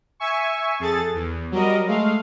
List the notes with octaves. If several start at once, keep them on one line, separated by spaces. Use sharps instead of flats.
E5 G#5 C#6
F2 G#4 A4 A6
E2
F#3 G3 A#4 D#5
G#3 A3 F5